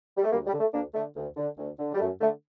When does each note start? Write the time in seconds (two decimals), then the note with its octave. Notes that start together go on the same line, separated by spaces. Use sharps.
0.16 G3
0.24 A3
0.31 D2 G3 A#3
0.46 G3
0.53 D3
0.59 A3
0.74 D2 A#3 D4
0.94 D3 A3
1.16 D2
1.36 D3
1.58 D2
1.78 D3
1.94 G3
1.99 F#2 A3
2.20 D3 A3